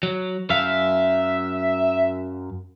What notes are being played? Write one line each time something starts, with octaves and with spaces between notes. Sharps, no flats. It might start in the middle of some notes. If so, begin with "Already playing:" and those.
F#3
F#2 E5 F5